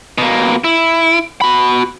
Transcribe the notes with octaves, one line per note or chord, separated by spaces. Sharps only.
B2 A#3
E4
F#4 B5